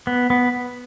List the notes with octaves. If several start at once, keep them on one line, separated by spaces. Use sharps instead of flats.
B3
B3